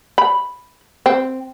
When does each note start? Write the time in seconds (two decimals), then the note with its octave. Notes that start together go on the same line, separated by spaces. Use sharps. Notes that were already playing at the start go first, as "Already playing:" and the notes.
0.18 B5
1.06 C4